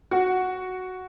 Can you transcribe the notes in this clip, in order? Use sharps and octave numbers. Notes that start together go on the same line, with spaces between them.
F#4